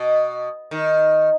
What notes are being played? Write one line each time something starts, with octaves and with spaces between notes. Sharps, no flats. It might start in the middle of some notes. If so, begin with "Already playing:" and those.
Already playing: B2
D#3